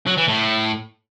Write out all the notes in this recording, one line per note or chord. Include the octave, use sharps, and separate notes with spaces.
F#3
E3
A2